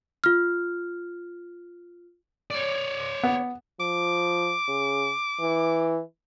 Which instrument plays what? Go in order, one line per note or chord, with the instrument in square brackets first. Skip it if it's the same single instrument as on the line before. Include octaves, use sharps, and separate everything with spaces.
[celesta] F4 F6
[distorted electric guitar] C#5 D5
[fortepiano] B3
[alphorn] F3 [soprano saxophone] D6
[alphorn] C#3
E3